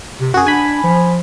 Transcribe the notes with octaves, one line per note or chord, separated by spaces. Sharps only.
C3
F#2 F#4 G#4
D4 G#5 B5
F3